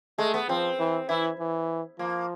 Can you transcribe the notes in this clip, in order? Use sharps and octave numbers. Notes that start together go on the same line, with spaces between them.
G#3 A3
B3
F3 C4
E3
E3 E4
E3
F3 A#3